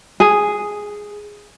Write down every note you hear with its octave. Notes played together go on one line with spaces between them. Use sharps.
G#4